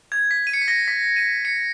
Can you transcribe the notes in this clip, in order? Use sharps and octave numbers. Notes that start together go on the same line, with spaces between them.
G#6
B6
D#7
C#7
B6
A#6
B6
D#7
C#7